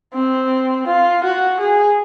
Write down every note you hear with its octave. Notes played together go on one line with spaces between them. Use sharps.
C4
F4
F#4
G#4